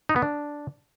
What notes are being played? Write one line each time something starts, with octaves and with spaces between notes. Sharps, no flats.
D#4
B3
D4